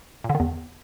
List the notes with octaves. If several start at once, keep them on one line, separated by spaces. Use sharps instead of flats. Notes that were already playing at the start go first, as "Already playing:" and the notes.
A#2
D3
D#3
E2